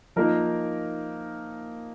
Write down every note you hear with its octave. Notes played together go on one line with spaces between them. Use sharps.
F3 A#3 D#4 A#4